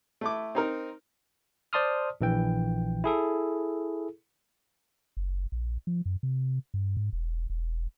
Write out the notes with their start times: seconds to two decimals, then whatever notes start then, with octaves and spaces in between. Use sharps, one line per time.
0.21 A3 E4 D6
0.55 C4 D#4 A#4
1.73 C5 D5 A5 C6 D#6 F6
2.21 A#1 E3 G5
3.04 E4 G#4 A4
5.17 F#1
5.52 A#1
5.87 F3
6.06 F#2
6.23 C3
6.74 G2
6.97 G#2
7.13 E1
7.50 E1